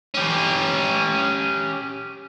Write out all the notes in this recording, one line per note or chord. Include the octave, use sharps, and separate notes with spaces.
C#4 G4